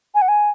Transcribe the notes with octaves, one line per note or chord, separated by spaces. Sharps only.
G#5
F#5
G#5